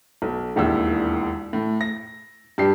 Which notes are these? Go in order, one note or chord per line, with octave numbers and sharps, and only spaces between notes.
B1
E1 A#1 D#2 E4 E6
A2
A#6
G2 G4 C7